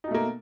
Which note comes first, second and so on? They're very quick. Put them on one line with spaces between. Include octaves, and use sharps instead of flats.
D#4 B2 A3 A#3